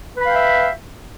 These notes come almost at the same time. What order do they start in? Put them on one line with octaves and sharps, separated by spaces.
B4 B5 F5 G5 E5